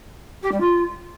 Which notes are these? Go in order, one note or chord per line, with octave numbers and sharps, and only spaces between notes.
G4
G3
F4